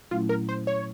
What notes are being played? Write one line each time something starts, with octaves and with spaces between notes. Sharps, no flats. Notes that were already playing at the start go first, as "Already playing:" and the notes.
A#2 F#3 A3 C#4 E4 F4
A#4
C5
C#5